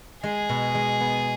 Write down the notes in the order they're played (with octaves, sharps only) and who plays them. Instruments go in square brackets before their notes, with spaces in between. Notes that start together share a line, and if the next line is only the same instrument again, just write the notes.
[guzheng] G#3 [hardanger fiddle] G#4
[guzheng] B2
G#3
B3